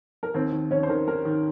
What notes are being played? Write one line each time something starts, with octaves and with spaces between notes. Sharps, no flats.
A#4
D#2 C4 C5
D#3
D#2 C#4 C#5
C5
D#3 A#4
D#3 A#4
D#3